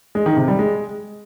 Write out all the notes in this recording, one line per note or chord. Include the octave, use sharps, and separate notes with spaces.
G#3
D#3
C3
G3
G#3